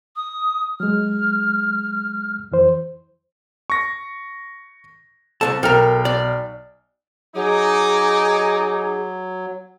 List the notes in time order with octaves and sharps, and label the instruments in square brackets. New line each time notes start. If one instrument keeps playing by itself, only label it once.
[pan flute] D#6
[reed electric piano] F#3 G#3 [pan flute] F6
[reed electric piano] F2 E3 C5
[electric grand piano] C#6 A#6
[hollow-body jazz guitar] C2 G#3 A5 [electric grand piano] A4
[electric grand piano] B1 G5 F6 [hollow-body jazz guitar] A4 A#4
[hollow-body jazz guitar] D5
[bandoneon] F#3 [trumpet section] D#4 D6 [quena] G#4